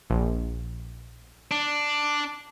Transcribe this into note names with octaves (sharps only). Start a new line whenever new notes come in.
A#1
D4